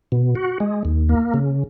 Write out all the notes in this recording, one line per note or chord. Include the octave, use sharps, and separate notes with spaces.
B2
F#4
G#3
D#2
A#3
C#3